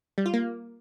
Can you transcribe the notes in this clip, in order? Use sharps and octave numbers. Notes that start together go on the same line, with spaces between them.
G3
F4
A#3